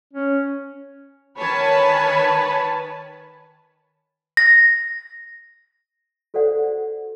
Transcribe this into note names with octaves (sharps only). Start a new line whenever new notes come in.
C#4
D#3 B4 C#5 G#5 A5 B5
A#6
F#4 A4 C5 D5 F#5